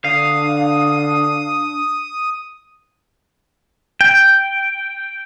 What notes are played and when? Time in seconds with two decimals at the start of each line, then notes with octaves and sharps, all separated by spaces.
0.04 D3 D4 F5 D#6
4.01 G5